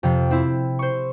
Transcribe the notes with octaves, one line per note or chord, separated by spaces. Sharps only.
F2 C3 C4
C4 E4
C5 C#6